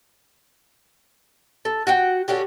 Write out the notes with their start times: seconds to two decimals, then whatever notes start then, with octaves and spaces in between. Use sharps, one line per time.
1.65 A4
1.87 F#4 F#5 G5
2.28 D3 C#4 F#4 G4